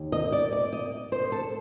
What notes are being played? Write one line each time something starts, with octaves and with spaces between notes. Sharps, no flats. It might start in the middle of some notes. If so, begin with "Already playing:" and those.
Already playing: D#2
D#5
D5
D5
D#5
C5
A4